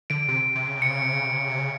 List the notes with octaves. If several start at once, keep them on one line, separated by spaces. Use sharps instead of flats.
D3 D7
C3 D7
C3
C#3
C3 C#7
C#3
C3
C#3
C3
C#3
C3
C#3